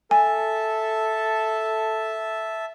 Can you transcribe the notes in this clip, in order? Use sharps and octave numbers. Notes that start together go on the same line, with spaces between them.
A4 E5 G#5 A5